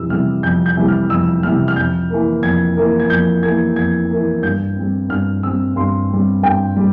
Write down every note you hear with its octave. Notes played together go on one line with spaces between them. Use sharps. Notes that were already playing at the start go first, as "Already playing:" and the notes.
Already playing: F2 C3 E3 G3 E6
C3 E3 G3 F6
F2 G6
G6
C3 E3 G3
F6
F2 E6
C3 E3 G3 F6
F6
F2 G6
E3 A#3
F2 G#6
E3 A#3
G#6
F2 G6
E3 A#3 G#6
F2 G#6
E3 A#3
G2 G6
G3 C4
G2 F6
G3 C4 E6
G2 C6
G3 C4
G2 G5
G3